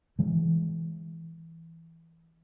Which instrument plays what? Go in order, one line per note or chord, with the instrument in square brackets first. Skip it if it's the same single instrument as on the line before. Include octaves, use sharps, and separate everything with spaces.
[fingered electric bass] E3 G#3